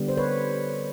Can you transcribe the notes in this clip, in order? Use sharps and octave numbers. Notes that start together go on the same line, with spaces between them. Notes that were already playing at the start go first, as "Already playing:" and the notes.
Already playing: D3 G3 B3
C5
B4 C#5